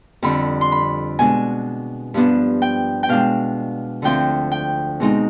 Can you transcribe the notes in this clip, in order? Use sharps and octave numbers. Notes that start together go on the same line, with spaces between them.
F2 D3 G3 C4 B5
C6
B5
B2 G#3 D4 G#5
G2 F3 B3 D4
G5
G5
B2 G#3 D4 F5
D2 D3 F3 C4 G5
G5
B2 G#3 C4 D#4